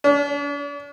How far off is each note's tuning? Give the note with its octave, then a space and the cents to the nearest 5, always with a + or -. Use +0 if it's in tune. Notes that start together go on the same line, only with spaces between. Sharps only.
D4 -45